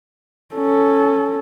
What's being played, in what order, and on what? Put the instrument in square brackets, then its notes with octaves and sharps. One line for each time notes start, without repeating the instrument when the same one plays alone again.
[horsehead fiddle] C#4 A4